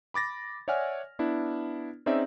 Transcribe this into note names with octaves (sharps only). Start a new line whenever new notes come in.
B5 D6 A6 A#6
C#5 D5 E5 F#5 G#5 F6
B3 D4 E4
C4 C#4 D#4 G#4 D5 E5